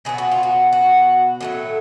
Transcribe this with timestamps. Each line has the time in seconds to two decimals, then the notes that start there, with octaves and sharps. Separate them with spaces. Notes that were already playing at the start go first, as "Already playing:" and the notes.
0.05 B2 F#3 B3 G#4
0.18 F#4
0.32 F4
0.43 F#4
0.73 F#4
1.41 A2 F#3 A3